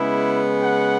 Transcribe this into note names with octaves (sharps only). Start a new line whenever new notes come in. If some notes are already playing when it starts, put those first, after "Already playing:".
Already playing: C#3 G#3 B3 E4
F#5